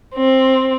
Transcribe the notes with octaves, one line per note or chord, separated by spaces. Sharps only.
C4